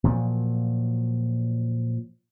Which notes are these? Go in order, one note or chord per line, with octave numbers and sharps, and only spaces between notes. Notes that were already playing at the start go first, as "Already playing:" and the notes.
A#2 F3 F#3